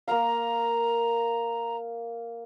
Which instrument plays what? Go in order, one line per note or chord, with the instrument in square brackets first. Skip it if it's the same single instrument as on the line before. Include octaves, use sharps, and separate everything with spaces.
[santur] A#3 A#4 F5 [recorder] A#5